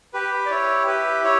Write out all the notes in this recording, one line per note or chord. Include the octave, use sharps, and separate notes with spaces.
G4 B4
D5
E4 C#5
G4 B4
E4 C#5